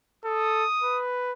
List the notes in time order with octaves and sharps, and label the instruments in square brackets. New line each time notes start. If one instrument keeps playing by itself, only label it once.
[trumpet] A4 [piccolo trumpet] D#6
[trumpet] B4